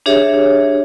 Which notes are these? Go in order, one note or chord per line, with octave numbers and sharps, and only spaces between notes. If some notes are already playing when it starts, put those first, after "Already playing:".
D4 G4 G#4 C#5 E5